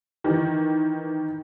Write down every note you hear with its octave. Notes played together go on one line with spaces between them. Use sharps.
D#3 E3